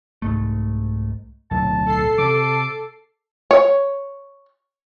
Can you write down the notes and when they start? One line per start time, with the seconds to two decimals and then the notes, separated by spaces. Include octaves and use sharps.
0.22 C2 G#2 A3
1.51 D1 B1 A5
1.86 A4 C7
2.18 C3 D6
3.51 C#5